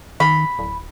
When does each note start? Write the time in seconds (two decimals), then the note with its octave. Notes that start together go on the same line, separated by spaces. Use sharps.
0.20 D#3 B5
0.59 D1